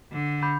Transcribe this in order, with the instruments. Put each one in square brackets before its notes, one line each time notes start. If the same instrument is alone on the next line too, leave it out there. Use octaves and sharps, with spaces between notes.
[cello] D3
[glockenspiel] B5 D6 G6